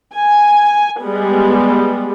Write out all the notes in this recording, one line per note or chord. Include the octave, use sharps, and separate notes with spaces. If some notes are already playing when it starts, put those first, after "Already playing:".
G#5
G3 G#3 B3